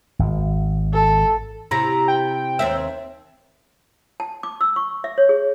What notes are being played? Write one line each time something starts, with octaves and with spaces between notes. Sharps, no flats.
G#1
A4
C3 E4 A#5
G5
D#2 C4 E5
A5
D6
E6
C#6
E5
C#5
G#4